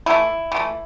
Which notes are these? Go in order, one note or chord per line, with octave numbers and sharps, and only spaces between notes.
E3 A3 E4
E3 A3